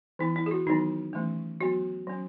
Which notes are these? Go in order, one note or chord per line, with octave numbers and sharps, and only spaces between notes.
E3 B3 E4
E4
G#4
F#4
D#3 F#3 B3 D#4
E3 A3 C#4
F#3 B3 F#4
F#3 C#4